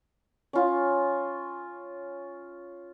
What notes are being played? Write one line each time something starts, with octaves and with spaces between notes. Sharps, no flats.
C#4 F4